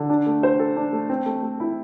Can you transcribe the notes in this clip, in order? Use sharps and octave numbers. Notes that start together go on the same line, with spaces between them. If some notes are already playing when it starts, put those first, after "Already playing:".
Already playing: D3
D4
A3
C5
A4
D4
A3
C4
A3
A3
E4